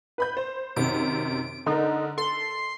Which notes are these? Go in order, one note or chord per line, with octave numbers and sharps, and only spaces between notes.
B4 B5 G6
C5
F#2 C3 D#3 D7
D3 D#4 A#4
A4 C6